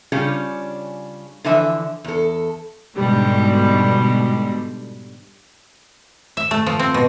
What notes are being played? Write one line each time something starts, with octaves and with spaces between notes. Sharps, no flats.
C#3 G3 C#4 D4 F4 G#4
D3 E3 F3 D4 E5 G#5
E2 A4
G#2 B2 D3 G3
E5
A3
F3
C4
B2